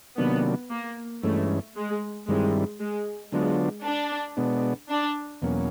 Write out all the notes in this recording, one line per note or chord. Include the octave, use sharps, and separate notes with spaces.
C3 D#3 F#3 A#3 B3 D4
A#3
G2 E3 G#3 A3 C#4
G#3
G2 D#3 G3 G#3 C4 E4
G#3
D3 F#3 G#3 B3 D4 F4
D4
B2 G#3 B3 D4
D4
E2 B2 F#3 A#3 C#4